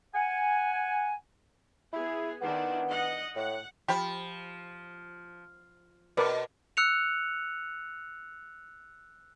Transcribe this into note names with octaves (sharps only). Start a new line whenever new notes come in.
F#5 G#5
B3 E4 G#4
D#3 B3 D4 E4
D#5 F#5
A2 F#5
F3 G4 B5
B2 A#4 B4 D5
E6 F#6 C#7 F7